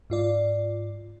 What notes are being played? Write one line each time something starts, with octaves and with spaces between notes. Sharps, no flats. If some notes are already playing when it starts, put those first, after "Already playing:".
G#2 F4 D5